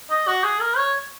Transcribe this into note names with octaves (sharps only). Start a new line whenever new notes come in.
D#5
F#4
G#4
A#4
C#5